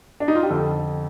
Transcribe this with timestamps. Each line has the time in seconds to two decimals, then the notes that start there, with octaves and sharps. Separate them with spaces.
0.20 D4
0.28 D#4
0.35 F4
0.43 G4
0.50 F2 D3 A4